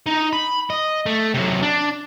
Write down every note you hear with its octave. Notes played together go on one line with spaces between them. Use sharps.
D#4
B5
D#5
A3
C3 F#3
D4